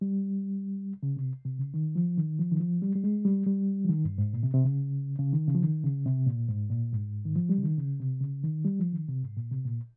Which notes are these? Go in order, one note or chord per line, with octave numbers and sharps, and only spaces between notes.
G3
C#3
C3
C3
C#3
D#3
F3
D#3
F3
D#3
F3
G3
G3
G#3
G3
G3
F3
D#3
G2
G#2
A#2
C3
C3
C#3
C#3
D#3
C#3
F3
D#3
C#3
C3
A#2
G#2
A#2
G#2
D#3
F3
G3
C#3
D#3
C#3
C3
C#3
D#3
G3
F3
D#3
C3
G#2
A#2
C3
A#2